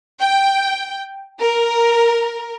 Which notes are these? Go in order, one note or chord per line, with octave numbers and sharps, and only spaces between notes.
G5
A#4